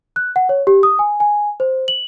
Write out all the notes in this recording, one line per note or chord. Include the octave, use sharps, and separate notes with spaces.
F#6
F#5
C#5
G4
D#6
G#5
G#5
C5
F#7